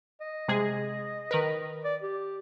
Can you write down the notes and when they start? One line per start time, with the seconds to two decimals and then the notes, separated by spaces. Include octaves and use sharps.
0.21 D#5
0.48 C3 G#3 G#4
1.31 D#3 A#4 B4
1.84 D5
2.02 G4